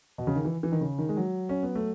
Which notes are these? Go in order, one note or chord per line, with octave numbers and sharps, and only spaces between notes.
B2
C#3
D#3
E3
E3
D#3
C#3
D#3
G#3
F#3
C#4
B3
A3